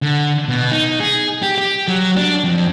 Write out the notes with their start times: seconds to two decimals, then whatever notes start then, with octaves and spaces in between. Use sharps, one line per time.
0.02 D3
0.48 B2
0.72 D#4
1.00 G#4
1.42 G4
1.58 G4
1.88 F#3
2.16 D4
2.44 F2